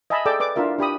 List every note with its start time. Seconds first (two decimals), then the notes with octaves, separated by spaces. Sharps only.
0.10 D#5 E5 G#5 A5 B5
0.26 G#4 A4 D5 G5 D6 E6
0.40 B4 D5 D6
0.56 D4 E4 F4 A#4 E5
0.79 D4 G4 B5 D#6